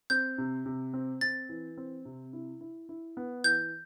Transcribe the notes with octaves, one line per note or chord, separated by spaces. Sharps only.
C4 G6
C3
C3
C4
C4 A6
E3
C4
C3
E4
E4
E4
B3
E3 G6